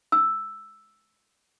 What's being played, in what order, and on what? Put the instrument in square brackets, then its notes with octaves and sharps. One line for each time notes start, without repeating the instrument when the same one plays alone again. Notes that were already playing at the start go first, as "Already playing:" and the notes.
[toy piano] E6